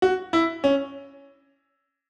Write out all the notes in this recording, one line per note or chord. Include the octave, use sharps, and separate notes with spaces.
F#4
E4
C#4